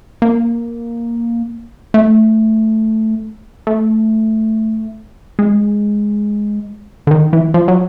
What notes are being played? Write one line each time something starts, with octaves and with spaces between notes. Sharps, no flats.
A#3
A3
A3
G#3
D3
D#3
E3
F3
F#3